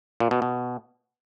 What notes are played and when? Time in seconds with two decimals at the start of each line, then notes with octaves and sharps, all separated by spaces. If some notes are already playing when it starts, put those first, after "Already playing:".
0.20 A#2
0.31 B2
0.42 B2